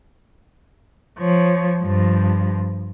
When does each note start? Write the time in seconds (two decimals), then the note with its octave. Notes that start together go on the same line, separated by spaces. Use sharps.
1.19 F3 C#5
1.81 G2 F3